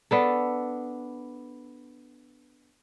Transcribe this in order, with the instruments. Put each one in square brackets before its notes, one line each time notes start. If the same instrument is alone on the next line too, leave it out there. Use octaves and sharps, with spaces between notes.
[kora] B3 D4 A4